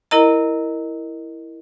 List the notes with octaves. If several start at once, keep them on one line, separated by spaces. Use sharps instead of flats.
E4 A#4 D#5 A#5